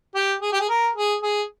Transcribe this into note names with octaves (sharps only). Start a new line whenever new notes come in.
G4
G#4
G4
G#4
A#4
G#4
G#4